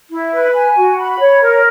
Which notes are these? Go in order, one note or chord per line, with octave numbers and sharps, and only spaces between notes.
E4
B4
G#5
F#4
B5
C#5
A#4